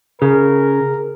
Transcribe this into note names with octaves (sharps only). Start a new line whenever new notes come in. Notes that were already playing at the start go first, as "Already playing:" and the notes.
C#3 G#4 A#4